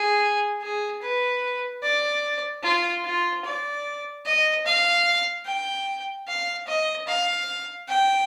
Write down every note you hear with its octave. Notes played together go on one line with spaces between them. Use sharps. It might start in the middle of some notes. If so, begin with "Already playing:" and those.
Already playing: G#4
G#4
B4
D5
F4
F4
D5
D#5
F5
G5
F5
D#5
F5
G5